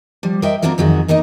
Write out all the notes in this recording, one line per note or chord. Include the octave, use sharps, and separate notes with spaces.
F3 G3
A#4 C5 D#5 E5 G5
A#3 C4 D4 F4 F#4 A#4
F2 D#3 F#3 F#4 G#4
E2 A#3 D#4 A#4 D#5